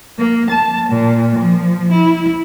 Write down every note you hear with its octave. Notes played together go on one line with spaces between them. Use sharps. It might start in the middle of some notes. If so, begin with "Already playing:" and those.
A#3
A5
A#2
F3
E4